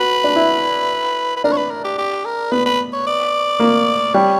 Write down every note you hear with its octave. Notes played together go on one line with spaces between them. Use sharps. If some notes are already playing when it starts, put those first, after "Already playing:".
Already playing: F#4 B4
D4
E4
B4
D4 A#4
C#5
B4
A#4
G4
G4
A#4
B3 B4
B4
C#5
D5
A#3
G3 C#5